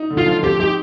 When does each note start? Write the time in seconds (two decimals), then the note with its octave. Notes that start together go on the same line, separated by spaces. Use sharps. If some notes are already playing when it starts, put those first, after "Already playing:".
Already playing: D#4
0.10 D3
0.18 F4
0.26 F3
0.43 C4 G4
0.60 D#4 G4